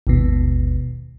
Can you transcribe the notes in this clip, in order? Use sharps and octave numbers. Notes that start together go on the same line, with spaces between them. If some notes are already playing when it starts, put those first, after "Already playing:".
G#1 D#2 B2